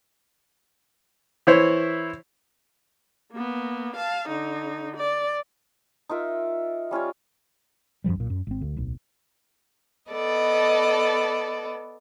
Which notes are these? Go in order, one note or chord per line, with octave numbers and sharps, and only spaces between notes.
E3 E4 C5 C#5
A#3 B3
F5 A5
D3 D#4
D5
D#4 F4 A#4 E5
G3 C#4 F4 C#5
F#2 B2 F3 G3
B1 A#2
F#2
G#1 C4
D2
D1 B1
B3 A4 D5 D#5